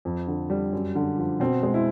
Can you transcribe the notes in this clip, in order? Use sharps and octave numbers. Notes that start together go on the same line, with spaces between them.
F2
D3
G3
F#2
D3
F3
B2 C4
G#3
E4